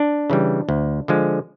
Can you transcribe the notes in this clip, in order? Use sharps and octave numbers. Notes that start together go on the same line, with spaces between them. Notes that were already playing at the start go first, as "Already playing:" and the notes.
Already playing: D4
C#3 E3 G3
D2
D3 F3 G#3